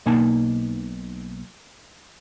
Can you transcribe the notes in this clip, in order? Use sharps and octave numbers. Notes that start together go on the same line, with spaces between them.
B1 B2 A#3 D#4 G#5 A5